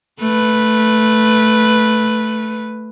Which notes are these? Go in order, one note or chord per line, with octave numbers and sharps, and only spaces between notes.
A3 B4